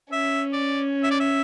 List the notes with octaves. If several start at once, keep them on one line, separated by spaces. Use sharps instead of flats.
C#4 E5
D5
E5
D5
E5